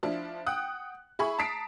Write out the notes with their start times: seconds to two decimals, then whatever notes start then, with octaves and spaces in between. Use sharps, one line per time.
0.03 F3 D4 E4
0.47 F#5 G5 D#6 F#6
1.19 E4 G#4 B5 C#6
1.39 A5 A#5 D#6 B6 C7 D7